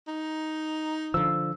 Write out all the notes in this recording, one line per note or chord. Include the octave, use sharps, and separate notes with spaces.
D#4
D3 F3 E6